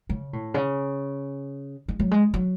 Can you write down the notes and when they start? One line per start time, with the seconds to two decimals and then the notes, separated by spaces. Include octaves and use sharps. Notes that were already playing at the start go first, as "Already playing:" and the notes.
0.09 C#3
0.33 A2
0.54 C#3
1.88 G#3
1.99 F#3
2.11 G#3
2.34 F#3